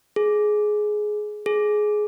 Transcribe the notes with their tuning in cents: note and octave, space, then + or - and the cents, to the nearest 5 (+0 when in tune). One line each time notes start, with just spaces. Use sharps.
G#4 +15
G#4 +15